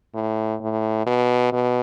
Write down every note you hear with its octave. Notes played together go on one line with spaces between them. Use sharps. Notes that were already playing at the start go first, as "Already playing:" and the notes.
A2
A2
B2
B2